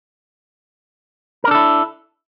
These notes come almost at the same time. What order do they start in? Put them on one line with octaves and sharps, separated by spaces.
A#4 D4 A4 E4